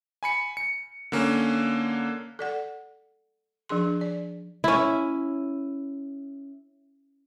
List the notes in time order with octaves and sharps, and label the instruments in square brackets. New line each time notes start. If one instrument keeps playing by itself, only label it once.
[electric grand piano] G#5 B5 C#7
C#7
D3 A#3 C#4
[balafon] A4 D5 F#5
F3 D4 G#4 C6
D5
[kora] C#4 E4